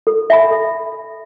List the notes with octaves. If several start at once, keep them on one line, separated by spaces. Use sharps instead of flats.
A4
E5 G#5 B5
A4